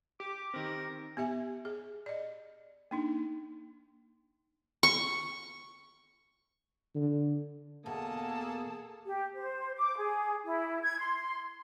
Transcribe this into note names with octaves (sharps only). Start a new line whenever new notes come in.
G4 D6
D#3 C4 A#4
B3 G4 E5 G#5
G#4
D5 D#5
A#3 D4 D#4
C#6
D3
E2 B2 A#3 G#4 A4 A5
G4
C5
D6
G#4
E4
G#6
C6